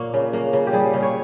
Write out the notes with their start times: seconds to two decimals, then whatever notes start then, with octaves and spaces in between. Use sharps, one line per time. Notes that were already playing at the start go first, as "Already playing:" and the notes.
Already playing: A#2 A#3 C#5
0.14 C#3
0.33 A#3
0.53 C#3
0.67 G4
0.73 G3 G#4
0.93 C#3
1.03 C#5